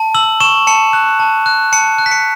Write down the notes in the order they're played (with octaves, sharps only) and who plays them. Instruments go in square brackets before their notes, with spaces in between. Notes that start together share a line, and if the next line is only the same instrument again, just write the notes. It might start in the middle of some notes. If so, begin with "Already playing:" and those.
Already playing: [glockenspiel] A5
E6 F#7
C#6 E7
A5 C#7
F#6
A5
F#6
A5 C#7
F#6
B6
C#7